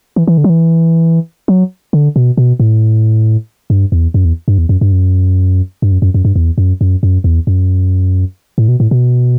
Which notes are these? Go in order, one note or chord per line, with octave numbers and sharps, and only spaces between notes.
E3
E3
D3
F#3
E3
F#3
D3
B2
B2
A2
G2
E2
F#2
E2
G2
E2
F#2
G2
F#2
G2
F#2
F#2
F#2
G2
E2
F#2
F#2
F#2
E2
F#2
A2
B2
A2
B2